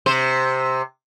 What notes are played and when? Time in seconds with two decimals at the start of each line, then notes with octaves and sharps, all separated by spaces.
0.06 C3 C5